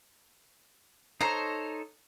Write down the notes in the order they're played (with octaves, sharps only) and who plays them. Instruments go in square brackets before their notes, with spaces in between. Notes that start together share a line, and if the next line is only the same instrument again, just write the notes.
[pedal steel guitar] D#4 A4 C#5 [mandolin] C5 A#5